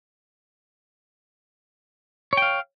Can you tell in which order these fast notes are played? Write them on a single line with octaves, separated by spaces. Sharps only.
C#5 G5 F5